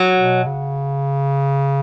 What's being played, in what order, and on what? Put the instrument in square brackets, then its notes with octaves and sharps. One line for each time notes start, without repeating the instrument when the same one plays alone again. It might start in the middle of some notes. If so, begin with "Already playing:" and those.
Already playing: [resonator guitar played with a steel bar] F#3
[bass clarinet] B2
C#3